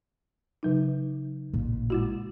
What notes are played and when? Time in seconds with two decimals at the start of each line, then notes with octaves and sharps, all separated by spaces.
0.63 C#3 F#3 D#4
1.54 A1 A#2
1.90 G#3 E4 F#4